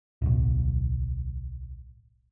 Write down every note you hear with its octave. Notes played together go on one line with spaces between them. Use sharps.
D1 B1